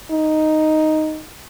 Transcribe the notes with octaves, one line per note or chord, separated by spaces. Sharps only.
D#4